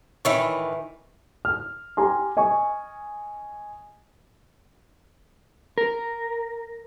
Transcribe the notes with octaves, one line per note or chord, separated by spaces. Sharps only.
A2 D#3 E3 C#5 E5 B5
F6
G4 G#5 A#5 C6
D#5 G#5 C#6
A#4